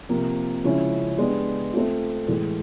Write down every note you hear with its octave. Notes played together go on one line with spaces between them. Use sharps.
C3 F3 A#3
C#3 F3 G#3 C#4 E4
G#3 B3 D4 G4
A3 C4 F4
A2 E3 G#3